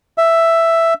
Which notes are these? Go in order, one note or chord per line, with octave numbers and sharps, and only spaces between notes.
E5